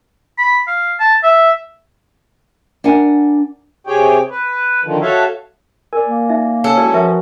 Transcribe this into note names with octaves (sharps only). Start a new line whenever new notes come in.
B5
F5
A5
E5
D4 A#4 F#5 G#5
C3 G4 G#4 C#5 G5
B4
D3 D#3 F3
F#4 A4 C#5 E5 F5
A#4 D5 G#5
A#3
D#4 E5
C#4 A4
G#3 E4 F#4 B4 C#5 D5
F3 F#4 A#4 B4 E5 G#5